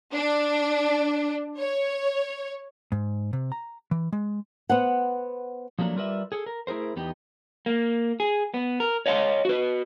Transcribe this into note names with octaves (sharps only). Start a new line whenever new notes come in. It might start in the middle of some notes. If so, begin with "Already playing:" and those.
D4
C#5
G#2
C3
A#5
E3
G#3
B3 C5 F#5
F3 F#3 A3 A#3 D4
G3 F4 A#4 B4 D5 E5
G#4 A4
A#4
A3 E4 G#4 A#4 C5
E2 B3 D#4 G4
A#3
G#4
B3
A#4
C#5 D#5 F5 G#5 C6
F#4 B4